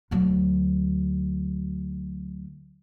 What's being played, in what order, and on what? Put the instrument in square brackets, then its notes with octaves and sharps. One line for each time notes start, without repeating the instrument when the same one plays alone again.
[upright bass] D2 F#3